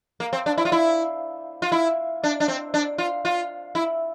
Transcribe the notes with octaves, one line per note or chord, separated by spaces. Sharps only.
A#3
C4
D4
E4
F4
E4
F4
E4
D4
D4
C4
D4
F4
F4
E4